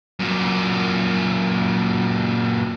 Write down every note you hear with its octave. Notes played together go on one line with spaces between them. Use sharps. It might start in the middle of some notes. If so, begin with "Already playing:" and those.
F#2 A#2